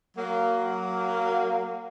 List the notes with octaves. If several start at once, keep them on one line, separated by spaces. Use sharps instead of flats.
F#3 A#3